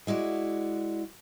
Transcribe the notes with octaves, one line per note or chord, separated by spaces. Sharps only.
G#3 E4 F#4 D5